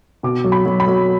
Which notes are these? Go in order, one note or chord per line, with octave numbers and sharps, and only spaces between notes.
B2 D6
F#3
B5
F#3
B5
F#3